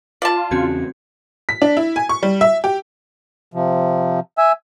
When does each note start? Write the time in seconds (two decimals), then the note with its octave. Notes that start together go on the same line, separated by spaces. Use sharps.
0.22 F4 D5 A5
0.51 E2 C#3 C4 C#4 F#4 G#6
1.49 B6
1.62 D4
1.77 E4
1.96 G#5
2.09 C#6
2.23 G3
2.41 E5
2.64 G4
3.54 C3 F3
4.38 E5 G#5 E6